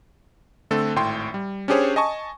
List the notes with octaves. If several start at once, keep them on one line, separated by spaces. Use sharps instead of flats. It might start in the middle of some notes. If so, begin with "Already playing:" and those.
D3 A3 C4 A4
G#1 A2 G5 C6
G3
C#4 D4 G4 G#4 C5 C#5
D#5 G#5 A5 C#6